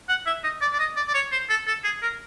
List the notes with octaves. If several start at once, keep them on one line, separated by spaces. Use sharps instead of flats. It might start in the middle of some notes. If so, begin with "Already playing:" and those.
F#5
E5
D#5
D5
D5
D#5
D5
D5
C#5
C5
A4
A4
G#4
A#4